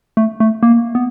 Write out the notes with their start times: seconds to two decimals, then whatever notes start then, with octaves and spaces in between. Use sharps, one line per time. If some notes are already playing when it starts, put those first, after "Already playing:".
0.17 A3
0.40 A3
0.63 A#3
0.95 B3